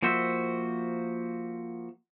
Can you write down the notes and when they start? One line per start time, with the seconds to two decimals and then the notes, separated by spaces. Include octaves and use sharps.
0.03 F3 A#3 F#4 C5 E5